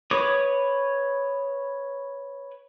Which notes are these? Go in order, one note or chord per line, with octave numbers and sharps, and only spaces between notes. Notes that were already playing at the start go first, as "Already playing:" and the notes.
B4 C#5 D6 D#6